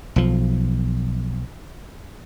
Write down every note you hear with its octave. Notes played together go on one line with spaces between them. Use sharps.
B1 F3